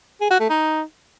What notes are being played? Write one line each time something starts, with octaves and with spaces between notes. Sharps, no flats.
G#4
F#4
A3
D#4